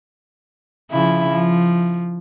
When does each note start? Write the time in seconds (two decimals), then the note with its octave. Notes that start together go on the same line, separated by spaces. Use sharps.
0.92 C#3 F3 E4
1.30 F3